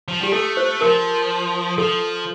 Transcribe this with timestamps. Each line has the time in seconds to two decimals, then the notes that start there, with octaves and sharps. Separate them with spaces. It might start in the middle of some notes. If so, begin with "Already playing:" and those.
0.08 F3
0.20 G3 G4
0.32 A3 A4
0.57 C5
0.81 F3 A#4
1.78 F3 A4